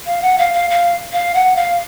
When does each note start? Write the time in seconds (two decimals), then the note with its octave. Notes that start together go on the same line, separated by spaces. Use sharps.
0.06 F5
0.22 F#5
0.38 F5
0.54 F5
0.70 F5
1.13 F5
1.35 F#5
1.56 F5